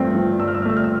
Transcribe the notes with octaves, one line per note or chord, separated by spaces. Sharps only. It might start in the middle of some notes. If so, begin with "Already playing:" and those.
Already playing: G2 F3 A3 C4
F3
G2 E6
F6
E6
F6
A3 E6
F6
E6